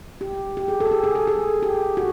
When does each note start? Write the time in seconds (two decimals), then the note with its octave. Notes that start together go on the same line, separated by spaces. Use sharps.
0.21 G4
0.57 G4
0.68 G#4
0.80 A4
0.87 G4
0.92 G#4
1.04 G#4
1.15 A4
1.27 G#4
1.63 G4
1.97 F#4